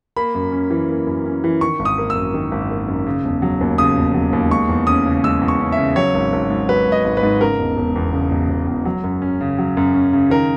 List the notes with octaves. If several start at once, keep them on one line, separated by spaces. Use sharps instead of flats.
A#3 B5
F#2
C#4
E3
A#3
F#2
C#4
E3
D#3 C#6
G#1
D#6
A#3
E6
F#2
D#3
G#1
A#3
F#2
C#3
E1
F#3
D#2
C#3 D#6
E1
F#3
D#2
G#3 C#6
E2
C#4 D#6
C#3
G#3 E6
E2
C#6
C#4
E5
C#3
F#3 C#5
G#1
G#1
G#2
F#3 B4
G#1
D#5
G#1
B4
G#2
C#3 A#4
E1
E1
E2
C#3
E1
E1
E2
F#3
F#2
C#4
C#3
F#3
F#2
C#4
C#3
D#3 A#4